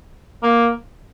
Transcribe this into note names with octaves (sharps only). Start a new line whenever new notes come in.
A#3